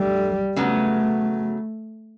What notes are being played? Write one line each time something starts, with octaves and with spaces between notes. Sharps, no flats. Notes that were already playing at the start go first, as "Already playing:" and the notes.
Already playing: D3 G3 A3
C#3 F#3 A3 B3